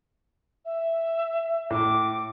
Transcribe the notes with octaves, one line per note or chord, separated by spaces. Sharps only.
E5
A2 D6